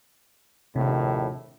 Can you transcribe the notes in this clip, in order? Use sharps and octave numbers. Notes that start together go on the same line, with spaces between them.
A#1 D#2 A2 C3